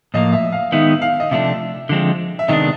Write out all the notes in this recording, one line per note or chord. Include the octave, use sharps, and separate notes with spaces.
A2 F3 A#3 D#5
E5
F5
D#3 G#3 B3 D#4 E5
F5
D#5
C3 F3 A3 D4 E5
D3 F3 G#3 C4
E5
C3 D#3 G#3 B3 D4 D#5